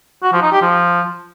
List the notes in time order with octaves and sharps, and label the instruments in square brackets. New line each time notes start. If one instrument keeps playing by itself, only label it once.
[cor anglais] F#4
F3
D#4
G4
F3